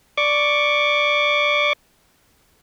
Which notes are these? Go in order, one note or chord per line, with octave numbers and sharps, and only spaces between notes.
D5 C#6 D6